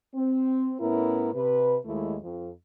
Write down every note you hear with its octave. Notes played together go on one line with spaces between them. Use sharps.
C4
A2 B3 C#4 E4 A#4
C3 B4
D#2 D#3 G#3 A3 E4
F2